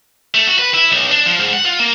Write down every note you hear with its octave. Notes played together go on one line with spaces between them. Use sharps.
A3
F#4
B4
E4
B1
D4
F3
G#2
F#5
F4
A#3